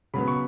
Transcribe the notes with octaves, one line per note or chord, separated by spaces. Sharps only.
C#3 F#3 B3 B5
C#6